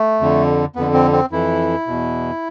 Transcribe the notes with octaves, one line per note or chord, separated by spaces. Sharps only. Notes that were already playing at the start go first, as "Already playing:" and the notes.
Already playing: A3
F2 D3
F2 D3 B3
C4
C4
F2 E3 E4
E2 B2